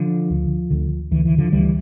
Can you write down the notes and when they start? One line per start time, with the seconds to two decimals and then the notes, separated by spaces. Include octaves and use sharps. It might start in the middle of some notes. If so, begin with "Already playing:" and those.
Already playing: D3 F3
0.30 D2 D3
0.70 D2 D3
1.11 D2 D3 E3
1.25 E3
1.38 D3 F3
1.52 D2 D3 E3 G3